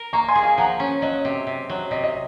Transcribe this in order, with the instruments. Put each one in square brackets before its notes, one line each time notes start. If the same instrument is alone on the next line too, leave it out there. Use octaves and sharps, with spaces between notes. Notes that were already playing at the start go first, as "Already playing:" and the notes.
Already playing: [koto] A#4
[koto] A#3 [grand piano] A#5 C#6
[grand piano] G#5 C6
[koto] G#4
[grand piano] F5 G#5
[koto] F3 [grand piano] F#5 A#5
[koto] C#4
[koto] F#3 [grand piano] D#5
[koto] C3
C3
F#3
[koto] C3 [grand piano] D#5
[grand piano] D#5